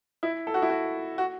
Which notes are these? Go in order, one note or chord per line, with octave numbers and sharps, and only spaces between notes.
E4
A4
F#4
E4
F#4
F#4